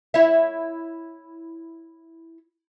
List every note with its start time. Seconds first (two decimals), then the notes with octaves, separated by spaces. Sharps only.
0.14 E4 C#5 E5